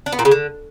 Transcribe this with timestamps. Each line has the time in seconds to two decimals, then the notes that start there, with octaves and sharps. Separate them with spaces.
0.06 D4
0.13 B3
0.19 A#2
0.25 C#3
0.31 D3